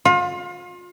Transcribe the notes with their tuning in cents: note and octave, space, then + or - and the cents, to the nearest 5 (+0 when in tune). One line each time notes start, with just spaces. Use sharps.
F4 +35